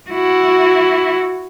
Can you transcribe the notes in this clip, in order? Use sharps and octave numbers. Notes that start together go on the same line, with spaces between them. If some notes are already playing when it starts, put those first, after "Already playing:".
E4 F#4